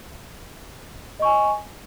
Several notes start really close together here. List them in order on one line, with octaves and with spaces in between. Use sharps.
D#5 C#6 G#5